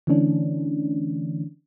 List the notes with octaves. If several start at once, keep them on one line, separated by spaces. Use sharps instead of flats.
D3 E3 A3 C#4 D4